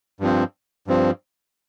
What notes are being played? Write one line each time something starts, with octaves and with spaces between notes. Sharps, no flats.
G2 F3 C4
G2 F3 C4